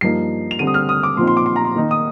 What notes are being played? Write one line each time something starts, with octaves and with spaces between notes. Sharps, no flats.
G2 F3 A#3 D#4 C7
F7
D3 G3 C4 D#7
D#6
F6
D#6
D6
A#2 F3 C4 D#4 C6
C6
D6
C6
A#5
C6
D#3 A#3 D#4
D#6